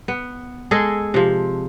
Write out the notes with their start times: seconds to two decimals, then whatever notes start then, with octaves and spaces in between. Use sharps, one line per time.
0.08 B3
0.71 G#3 G#4 A4 D#5
1.14 C3 F3